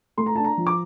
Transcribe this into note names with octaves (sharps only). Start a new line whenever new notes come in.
A3 C6
A#5
D4 A5
A#5
F3
D6